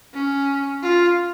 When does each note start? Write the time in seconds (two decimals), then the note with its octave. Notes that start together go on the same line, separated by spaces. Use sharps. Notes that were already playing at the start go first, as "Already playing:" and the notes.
0.14 C#4
0.83 F4